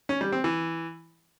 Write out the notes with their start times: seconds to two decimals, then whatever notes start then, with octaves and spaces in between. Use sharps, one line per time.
0.09 C#4
0.21 G3
0.32 C4
0.44 E3